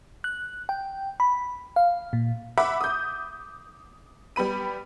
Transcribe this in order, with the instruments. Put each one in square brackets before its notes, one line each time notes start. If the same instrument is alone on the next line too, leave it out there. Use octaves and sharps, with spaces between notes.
[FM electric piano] F#6
G5
B5
F5
A#2
[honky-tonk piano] E5 F#5 B5 D6
D#6 G6
G3 B3 B5 D#7